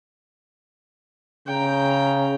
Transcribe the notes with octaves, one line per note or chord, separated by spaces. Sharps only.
C#3 G5 A#5